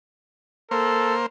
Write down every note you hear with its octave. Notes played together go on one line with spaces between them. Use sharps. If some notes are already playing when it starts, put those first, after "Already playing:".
A#3 A4 C5